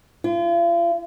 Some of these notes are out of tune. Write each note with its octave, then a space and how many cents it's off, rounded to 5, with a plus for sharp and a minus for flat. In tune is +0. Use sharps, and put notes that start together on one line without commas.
F4 -40